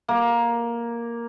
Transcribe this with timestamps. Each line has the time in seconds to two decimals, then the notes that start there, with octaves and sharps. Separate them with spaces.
0.08 A#3